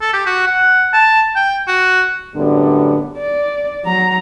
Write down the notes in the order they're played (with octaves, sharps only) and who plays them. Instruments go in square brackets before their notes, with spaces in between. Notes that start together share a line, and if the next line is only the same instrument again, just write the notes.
[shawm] A4
G4
F#4
F#5
A5
G5
F#4
[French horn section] F#2 A2 D3 F#3 G3 B3
[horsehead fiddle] D5
F#3 A#5